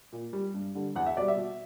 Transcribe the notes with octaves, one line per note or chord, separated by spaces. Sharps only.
A#2
G3
G2
D3 G3
E2 F#5
E5
B2 G3 D5
E5
B2